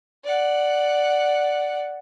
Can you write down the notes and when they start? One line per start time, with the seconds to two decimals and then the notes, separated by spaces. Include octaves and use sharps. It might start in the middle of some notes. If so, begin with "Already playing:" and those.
0.24 D5 F#5